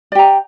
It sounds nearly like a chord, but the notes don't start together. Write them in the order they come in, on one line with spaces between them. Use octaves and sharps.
D5 G4 A#5